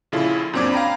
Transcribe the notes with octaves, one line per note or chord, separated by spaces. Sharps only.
A#1 C#3 E4 F4 A4
F#2 A#2 C4 D4 D6 G#6
F5 G5 A#5 B5